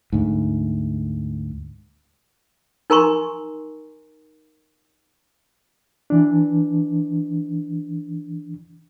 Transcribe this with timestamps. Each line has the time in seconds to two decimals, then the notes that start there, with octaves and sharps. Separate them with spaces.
0.13 D2 G#2
2.90 D#4 A#4 G#5 A#5 C6 C#6
6.10 E3 D4